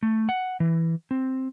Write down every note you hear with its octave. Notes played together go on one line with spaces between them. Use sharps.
A3
F#5
E3
C4